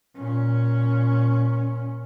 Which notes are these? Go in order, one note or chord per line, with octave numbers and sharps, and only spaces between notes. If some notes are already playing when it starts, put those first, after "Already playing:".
A#2 C#4